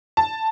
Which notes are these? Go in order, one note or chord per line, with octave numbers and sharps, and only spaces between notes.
A5